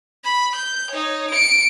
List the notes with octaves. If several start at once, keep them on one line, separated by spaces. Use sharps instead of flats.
B5
G6
D#4 C#5
C#7 D7